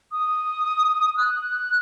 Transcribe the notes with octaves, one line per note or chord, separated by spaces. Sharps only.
D#6
F#6